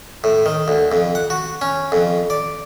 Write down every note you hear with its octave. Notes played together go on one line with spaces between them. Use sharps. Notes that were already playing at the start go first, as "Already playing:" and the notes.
A2
D#3
D2
F2
F#5
F#4
C#4
F2
D5